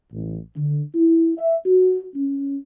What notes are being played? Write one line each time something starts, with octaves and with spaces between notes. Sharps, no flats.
A1
D3
E4
E5
F#4
C#4